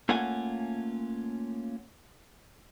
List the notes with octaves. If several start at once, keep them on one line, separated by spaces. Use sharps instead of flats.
A3 A#3 C#4 F4 F#5 G#5